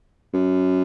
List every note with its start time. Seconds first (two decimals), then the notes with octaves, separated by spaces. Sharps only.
0.34 F#2